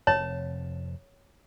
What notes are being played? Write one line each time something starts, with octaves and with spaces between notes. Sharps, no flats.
F1 F2 C3 C#5 A5